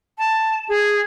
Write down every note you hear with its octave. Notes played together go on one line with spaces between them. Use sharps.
A5
G#4